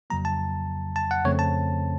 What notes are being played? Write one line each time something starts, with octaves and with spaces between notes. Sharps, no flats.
F2 C#3 F#3 A#3 A#5
A5
A5
F#5
F2 C#3 A3 C4 C#5
A5